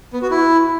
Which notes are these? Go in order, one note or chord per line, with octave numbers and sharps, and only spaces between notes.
B3
F#4
E4